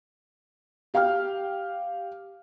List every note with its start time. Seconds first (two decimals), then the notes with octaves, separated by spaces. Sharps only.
0.94 G4 F5 G5 F6